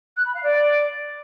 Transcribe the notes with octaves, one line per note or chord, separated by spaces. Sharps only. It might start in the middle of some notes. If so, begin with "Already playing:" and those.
F#6
B5
F5
D5